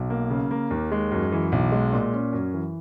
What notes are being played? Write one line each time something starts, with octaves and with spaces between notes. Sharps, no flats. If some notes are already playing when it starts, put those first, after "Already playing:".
Already playing: B1
A#3
C#3
A#3
D#2
G#3
F#2
E3
B1
G#3
A#2
C#4
F#2
E3